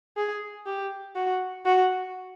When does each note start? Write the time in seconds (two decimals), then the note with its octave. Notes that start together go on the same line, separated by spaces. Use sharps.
0.17 G#4
0.66 G4
1.15 F#4
1.65 F#4